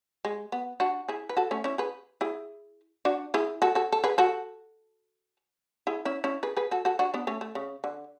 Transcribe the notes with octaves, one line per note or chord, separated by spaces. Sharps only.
G#3
B3
D4 F#4
E4 G#4
B4
F#4 A4
A3 C#4
C#4 E4
G#4 B4
E4 G#4
D4 F#4
E4 G#4
F#4 A4
F#4 A4
A4
G#4 B4
F#4 A4
E4 G#4
C#4 E4
C#4 E4
G#4 B4
G#4 B4
F#4 A4
F#4 A4
D4 F#4
B3 D4
A3 C#4
A3
C#3
D3